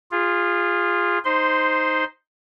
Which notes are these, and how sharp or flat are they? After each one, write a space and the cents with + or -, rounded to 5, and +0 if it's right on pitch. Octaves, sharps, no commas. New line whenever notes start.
F4 +0 G#4 -25
D#4 +0 C5 +0 C6 -15